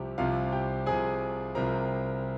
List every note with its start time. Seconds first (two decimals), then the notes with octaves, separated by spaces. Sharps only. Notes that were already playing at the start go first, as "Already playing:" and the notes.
Already playing: C2 C3 F3 C4 G4
0.18 C2 C3 F3 C4 F4 F5
0.52 G4 G5
0.86 C2 C3 F3 C4 G#4 G#5
1.55 C2 C3 F3 C4 A#4 A#5